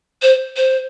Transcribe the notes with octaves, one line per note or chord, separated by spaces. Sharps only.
C5
C5